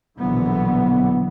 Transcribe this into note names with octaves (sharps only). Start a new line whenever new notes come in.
A#1 B2 D3 E3 F#3 B3